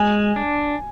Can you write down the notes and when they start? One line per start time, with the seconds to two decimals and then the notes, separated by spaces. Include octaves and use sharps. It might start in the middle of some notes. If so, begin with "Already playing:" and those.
Already playing: G#3 G#5
0.36 D4